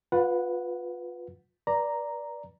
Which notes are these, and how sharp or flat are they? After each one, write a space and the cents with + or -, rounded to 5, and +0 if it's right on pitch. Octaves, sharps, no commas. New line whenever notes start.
F4 +25 B4 +0 F#5 -5
B4 -30 D5 +0 A#5 +0